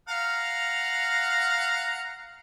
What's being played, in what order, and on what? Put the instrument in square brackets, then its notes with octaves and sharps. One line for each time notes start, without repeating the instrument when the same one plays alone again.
[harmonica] F5 F#5 A#5